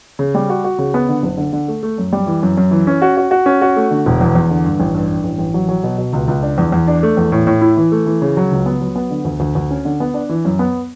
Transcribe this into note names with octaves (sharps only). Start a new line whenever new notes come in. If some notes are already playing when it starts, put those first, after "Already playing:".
C#3
G3
F#4
F#4
C#3
B3
D3
F#1
D3
D3
A3
A3
F#2
G3
E3
F#2
F#2
E3
C#4
F#4
F#4
F#4
C#4
F#4
A3
D3
E1
E2
E2
D3
G2
A1
G2
G2
A1
A1
F#3
F#3
B2
B2
C#2
C#2
D4
E2
E2
D4
A3
E2
A2
A2
E4
E3
A3
E3
C#3
F#3
C#2
B3
F#3
B3
D3
D2
D2
D2
C#4
D3
B3
D4
E3
F#2
B3